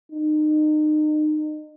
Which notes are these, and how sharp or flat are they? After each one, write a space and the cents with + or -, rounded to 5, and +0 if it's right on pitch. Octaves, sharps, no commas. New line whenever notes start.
D#4 -30